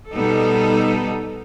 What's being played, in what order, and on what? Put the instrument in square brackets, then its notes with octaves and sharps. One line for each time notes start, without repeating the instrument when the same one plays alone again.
[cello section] B2 G3 B3 D#4 A4